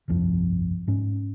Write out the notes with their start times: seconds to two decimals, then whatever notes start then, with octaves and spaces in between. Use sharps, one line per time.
0.08 G1 C2 F2 F3
0.87 G#2 C#4